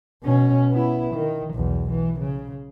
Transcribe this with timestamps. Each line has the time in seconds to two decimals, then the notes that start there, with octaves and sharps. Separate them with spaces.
0.23 B2 C#4
0.71 B3 E4
1.13 D#3
1.54 B1 E2
1.91 E3
2.20 C#3